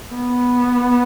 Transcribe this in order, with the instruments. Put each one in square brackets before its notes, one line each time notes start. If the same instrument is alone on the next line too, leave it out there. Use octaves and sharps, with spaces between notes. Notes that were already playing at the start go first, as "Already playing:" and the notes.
[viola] B3